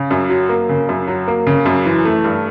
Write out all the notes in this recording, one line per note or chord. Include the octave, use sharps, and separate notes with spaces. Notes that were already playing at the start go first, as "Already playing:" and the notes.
Already playing: C#3
F#2
F#3
A#3
C#3
F#2
F#3
A#3
C#3
F#2
E3
A3
G2